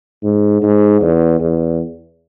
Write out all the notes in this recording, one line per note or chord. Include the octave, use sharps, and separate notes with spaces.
G#2
G#2
E2
E2